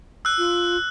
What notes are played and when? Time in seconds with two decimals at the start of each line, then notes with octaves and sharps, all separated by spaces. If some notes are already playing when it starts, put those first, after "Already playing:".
0.25 E6 F#6
0.38 F4